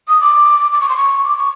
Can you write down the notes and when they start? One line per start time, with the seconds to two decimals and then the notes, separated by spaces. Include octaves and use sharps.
0.08 D#6
0.21 D6
0.73 D6
0.81 C#6
0.89 C6
0.97 C#6
1.24 D6
1.38 C#6